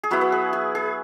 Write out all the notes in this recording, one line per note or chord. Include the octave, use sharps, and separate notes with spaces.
G#4
F#3 B3 E4 F#4 B4
B4
G#4
G#4
G#4